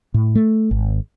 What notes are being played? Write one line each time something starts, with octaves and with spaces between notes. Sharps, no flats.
A2
A3
G#1